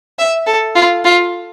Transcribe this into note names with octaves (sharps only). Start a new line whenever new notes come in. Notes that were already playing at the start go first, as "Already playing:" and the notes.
E5
A4
F4
F4